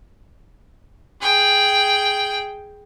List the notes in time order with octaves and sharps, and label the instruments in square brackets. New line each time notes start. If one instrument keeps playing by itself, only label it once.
[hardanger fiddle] G#4 G5